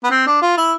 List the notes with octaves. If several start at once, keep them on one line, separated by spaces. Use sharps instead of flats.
B3
C4
D4
F4
E4